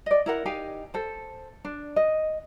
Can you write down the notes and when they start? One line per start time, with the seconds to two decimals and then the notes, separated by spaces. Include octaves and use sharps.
0.06 D5 D#5
0.26 E4 A#4 F#5
0.45 D#4 G4 F5 G#5
0.94 A4 C5
1.65 D4
1.96 D#5